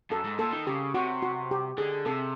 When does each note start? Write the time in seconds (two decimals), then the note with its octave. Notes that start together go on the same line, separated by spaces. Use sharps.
0.11 F#2 A4
0.25 G#2
0.39 A#2 A4
0.53 D#3
0.67 C#3 G4
0.94 C3 F#4
1.22 F#4
1.51 G4
1.78 D3 G#4
2.06 C3 A4